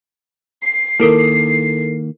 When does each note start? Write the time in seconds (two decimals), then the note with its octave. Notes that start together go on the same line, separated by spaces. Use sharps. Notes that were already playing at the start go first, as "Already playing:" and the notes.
0.64 C7
1.00 D#3 A#3 E4 A4 A#4